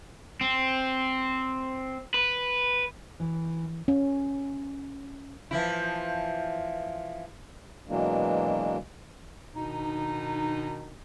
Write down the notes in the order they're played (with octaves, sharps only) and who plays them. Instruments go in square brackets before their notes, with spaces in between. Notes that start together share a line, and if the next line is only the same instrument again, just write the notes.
[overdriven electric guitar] C4
B4
[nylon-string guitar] E3
[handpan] C#4
[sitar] E3 F3 E4
[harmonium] B2 E3 F#3 G#3 A#3 D4
[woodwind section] B2 D#3 D4 D#4